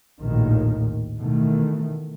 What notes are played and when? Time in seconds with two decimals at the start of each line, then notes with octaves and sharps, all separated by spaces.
0.22 A#1 D#2 A2 D#3
1.18 B2 D#3 E3 A3